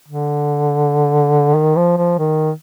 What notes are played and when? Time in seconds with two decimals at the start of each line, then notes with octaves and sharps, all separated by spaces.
0.08 D3
1.54 D#3
1.76 F3
1.97 F3
2.18 D#3